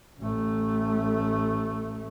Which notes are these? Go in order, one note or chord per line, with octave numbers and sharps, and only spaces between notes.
A1 A3